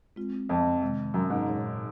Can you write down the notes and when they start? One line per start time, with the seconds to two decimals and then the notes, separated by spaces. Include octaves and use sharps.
0.16 G#3 C4 F4
0.49 F2
0.82 C3 D#3 G#3
1.14 F#2
1.30 G#2
1.46 A#2 G#3 D#4 G#4 C#5